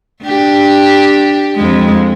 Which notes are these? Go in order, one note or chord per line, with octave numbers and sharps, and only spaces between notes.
D4 G4
F2 G#3